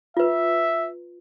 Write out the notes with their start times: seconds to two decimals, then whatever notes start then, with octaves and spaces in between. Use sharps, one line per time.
0.17 F4 B4 E5